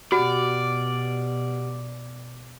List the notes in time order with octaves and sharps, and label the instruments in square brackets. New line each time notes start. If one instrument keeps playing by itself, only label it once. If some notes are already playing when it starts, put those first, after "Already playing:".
[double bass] B2 [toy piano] F#4 [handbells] G4 F#5 F6 [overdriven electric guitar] D5